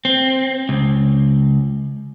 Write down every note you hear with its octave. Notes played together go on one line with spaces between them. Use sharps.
C4
C#2